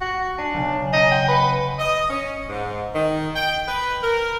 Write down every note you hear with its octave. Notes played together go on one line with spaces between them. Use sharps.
F#4
D4 G#5
B1 C#3 G#5
C#4 D#5
F#5 G5 C6
B4 C#6 C#7
D#5
C#4
G#2
D#3
G5
B4
A#4